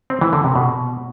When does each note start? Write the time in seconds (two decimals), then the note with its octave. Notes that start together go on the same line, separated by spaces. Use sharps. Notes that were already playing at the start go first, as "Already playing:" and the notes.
0.10 C4
0.21 E3
0.33 D3
0.44 C3
0.56 B2